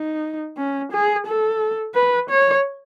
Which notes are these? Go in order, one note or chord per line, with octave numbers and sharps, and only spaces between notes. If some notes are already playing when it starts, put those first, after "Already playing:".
Already playing: D#4
C#4
G#4
A4
B4
C#5